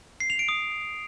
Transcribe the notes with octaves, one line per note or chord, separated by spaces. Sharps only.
C7
F7
D7
D#6